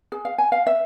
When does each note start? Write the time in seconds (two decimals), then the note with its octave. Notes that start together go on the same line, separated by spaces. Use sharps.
0.12 G#4
0.25 F5
0.38 G#5
0.52 F5
0.67 E5